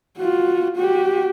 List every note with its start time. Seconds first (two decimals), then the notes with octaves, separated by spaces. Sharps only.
0.18 F4 F#4
0.77 F#4 G4